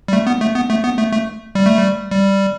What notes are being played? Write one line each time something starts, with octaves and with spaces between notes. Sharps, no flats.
G3
A3
B3
A3
B3
A3
B3
A3
A3
G3
A3
G3
G3